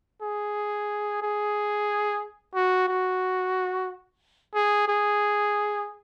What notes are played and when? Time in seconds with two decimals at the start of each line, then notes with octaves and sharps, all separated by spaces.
0.22 G#4
1.22 G#4
2.55 F#4
2.88 F#4
4.55 G#4
4.88 G#4